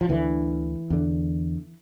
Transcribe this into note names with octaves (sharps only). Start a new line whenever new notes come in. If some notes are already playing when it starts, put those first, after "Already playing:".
F3
D2 D3 E3
E2 D3